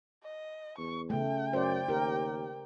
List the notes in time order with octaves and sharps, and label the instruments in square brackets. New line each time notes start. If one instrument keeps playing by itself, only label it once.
[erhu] D#5
[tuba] E2 [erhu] C#6
[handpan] C#3 A3 [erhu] G5
[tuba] F#2 [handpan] C5 D5
[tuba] D#2 [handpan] G4 A#4